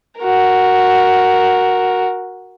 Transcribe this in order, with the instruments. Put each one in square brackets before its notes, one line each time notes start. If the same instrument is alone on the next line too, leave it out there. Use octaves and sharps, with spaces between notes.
[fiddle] F#4 A#4